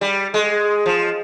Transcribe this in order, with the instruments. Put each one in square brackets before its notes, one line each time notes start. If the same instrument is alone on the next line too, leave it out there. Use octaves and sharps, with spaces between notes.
[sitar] G3
G#3
F3